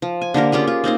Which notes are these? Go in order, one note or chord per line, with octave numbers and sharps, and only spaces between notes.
F3
G#5
D3 A#3 G4 A#4
C#4 F4 G4 G#4
F4
A#3 C4 D#4 C5